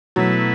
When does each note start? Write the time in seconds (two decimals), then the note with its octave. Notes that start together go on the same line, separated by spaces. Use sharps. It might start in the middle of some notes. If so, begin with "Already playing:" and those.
0.16 B2 F#3 A3 E4 B4